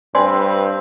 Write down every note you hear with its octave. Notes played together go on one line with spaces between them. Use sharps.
G2 C4 B4 D5 G#5 C6